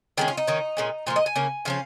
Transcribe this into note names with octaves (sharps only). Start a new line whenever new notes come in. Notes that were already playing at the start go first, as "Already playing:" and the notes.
D#3 G#3 C#4 G#4
F4
D#4
D#3 C#4
A#2 G#3 C#4
A#2 F3 A#3 F4
D#5
G#5
C#3 A#3 C#4
C#3 F3 C#4 F5